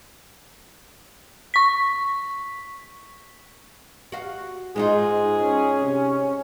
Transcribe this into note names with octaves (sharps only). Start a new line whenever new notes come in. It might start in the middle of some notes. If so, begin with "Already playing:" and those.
C#6 B6
F#4 F5
G#2 G#3 D#4 F4 G#4
C#4
C3